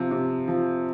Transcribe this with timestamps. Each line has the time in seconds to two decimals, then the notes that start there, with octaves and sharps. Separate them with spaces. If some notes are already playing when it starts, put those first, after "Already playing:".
Already playing: C3 F3
0.11 C3
0.48 F3